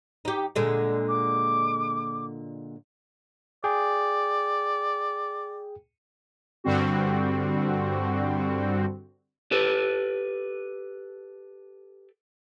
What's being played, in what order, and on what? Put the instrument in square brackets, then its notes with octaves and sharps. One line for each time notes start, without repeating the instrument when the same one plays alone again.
[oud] D#4 G4
A#2 D3 G#3
[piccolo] D6
[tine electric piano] G#4 G5 G#5 [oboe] D5
[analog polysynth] G2 D3 G3 C4 F#4
[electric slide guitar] G4 A4 B4